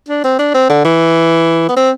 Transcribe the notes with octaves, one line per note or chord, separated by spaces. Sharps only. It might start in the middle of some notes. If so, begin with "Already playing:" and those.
D4
C4
D4
C4
D3
E3
B3
C4